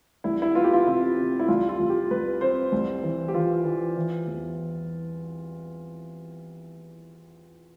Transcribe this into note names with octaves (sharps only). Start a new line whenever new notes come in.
C2 E4
E4
B3 F4
G4
F4
C3 E4
C3
E4
C2 F4
F4
C2
G4
C2 B4
C4 C5
C2
E3
G4
E3 F4
E3
E3
E2